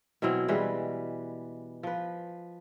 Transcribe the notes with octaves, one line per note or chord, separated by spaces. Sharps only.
B2 E3 F#3 C4
E3 G3 G#3 B4
F3 B4